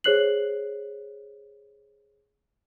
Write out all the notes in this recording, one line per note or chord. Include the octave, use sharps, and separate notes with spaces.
G#4 C5 C#5 F#6 C7 F#7